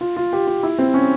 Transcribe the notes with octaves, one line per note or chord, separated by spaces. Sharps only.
F4
F4
G4
F4
E4
C4
C#4